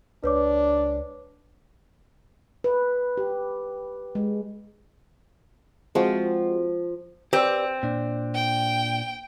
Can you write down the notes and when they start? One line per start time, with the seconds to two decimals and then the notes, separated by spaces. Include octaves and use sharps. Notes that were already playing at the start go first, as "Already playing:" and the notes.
0.24 C#2 D4 B4 C#5 D6
2.64 B4
3.18 G4
4.15 G#3
5.95 F3 G#3 C4 F4 F#4
7.33 C4 G4 B4 D5
7.83 A#2 D4
8.34 G5